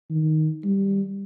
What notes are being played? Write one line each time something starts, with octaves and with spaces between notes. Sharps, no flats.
D#3
G3